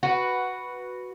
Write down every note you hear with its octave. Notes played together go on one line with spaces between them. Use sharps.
F#4 B4